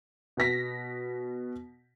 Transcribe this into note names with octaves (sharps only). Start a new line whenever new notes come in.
B2 B3 A#6 B6